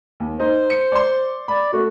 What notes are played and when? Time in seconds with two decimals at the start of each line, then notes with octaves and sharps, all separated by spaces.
0.20 D#2
0.40 D#4 C5
0.70 C#7
0.92 D5 C6
1.48 D5 B5
1.73 A3 F#4